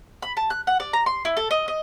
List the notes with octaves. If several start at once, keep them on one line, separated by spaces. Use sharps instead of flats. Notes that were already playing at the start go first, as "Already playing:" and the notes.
B5
A5
F#6
F#5
D5
A#5
C6
E4
A4
D#5
D#5